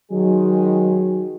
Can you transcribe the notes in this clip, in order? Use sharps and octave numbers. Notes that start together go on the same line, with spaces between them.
D#3 F#3 G#3 G#4